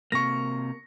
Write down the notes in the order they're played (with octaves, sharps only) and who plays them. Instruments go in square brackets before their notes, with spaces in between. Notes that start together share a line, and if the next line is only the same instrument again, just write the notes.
[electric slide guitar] C3 A#3 [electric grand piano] C#6 A#6